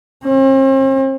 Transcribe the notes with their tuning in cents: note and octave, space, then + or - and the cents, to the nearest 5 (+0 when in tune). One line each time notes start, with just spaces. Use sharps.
C4 +45